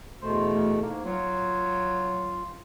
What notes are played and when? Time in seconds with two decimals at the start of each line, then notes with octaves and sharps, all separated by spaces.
0.22 E2 B2 A3 C5
0.52 D2
0.82 G#2 A#3
1.05 F#3 F4